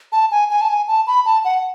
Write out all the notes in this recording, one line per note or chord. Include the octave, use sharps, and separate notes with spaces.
A5
G#5
G#5
A5
G#5
A5
B5
A5
F#5